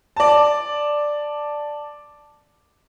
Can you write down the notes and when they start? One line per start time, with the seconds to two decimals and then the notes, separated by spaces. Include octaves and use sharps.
0.16 D5 A5